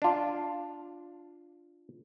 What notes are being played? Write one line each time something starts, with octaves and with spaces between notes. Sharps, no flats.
D4 F4